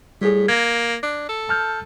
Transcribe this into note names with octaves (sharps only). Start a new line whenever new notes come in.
A2 G3 G#4
A#3 G#6 A#6
D4
A4
A5 F6 G6